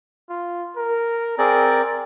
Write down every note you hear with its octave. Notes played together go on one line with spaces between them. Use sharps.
F4
A#4
C4 G#4 A#4 D5